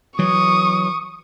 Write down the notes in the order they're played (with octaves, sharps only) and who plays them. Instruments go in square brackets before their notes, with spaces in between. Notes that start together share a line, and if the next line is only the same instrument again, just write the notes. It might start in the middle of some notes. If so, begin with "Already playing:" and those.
[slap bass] E3 F#3 [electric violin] C#6 D#6